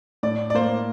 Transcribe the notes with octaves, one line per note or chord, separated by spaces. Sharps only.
A2 D5
D5
A#3 C5